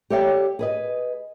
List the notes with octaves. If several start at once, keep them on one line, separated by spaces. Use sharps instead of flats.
G4 A4 C#5 D5 E5 G5
G#4 B4 D#5